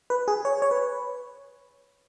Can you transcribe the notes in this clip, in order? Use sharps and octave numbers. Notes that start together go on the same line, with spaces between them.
B4
G#4
C#5
C#5
B4